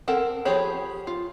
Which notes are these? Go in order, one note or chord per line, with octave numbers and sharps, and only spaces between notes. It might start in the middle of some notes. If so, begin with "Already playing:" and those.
C4 A4 A#4 F#5
F3 G4 G#4 C#5 B5
F4